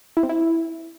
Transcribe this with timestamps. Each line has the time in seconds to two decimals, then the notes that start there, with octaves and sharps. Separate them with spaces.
0.17 E4
0.23 C4
0.29 E4